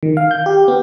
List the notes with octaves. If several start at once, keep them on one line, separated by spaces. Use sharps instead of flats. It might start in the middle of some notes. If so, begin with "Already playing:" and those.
D#3
F5
G6
G4
B3